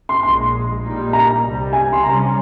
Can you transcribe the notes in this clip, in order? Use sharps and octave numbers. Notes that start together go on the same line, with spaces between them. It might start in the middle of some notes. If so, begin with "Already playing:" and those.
C6
A#1 A#2 G#3 C6
A#2 G3 A#3 D#4
A#5
C2 C3 G3
G#5
C6
C3 G3 C#4 A#5